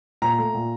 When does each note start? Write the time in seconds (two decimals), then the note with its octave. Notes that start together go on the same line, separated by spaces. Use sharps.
0.22 A#2 A#5
0.38 A3
0.54 A#2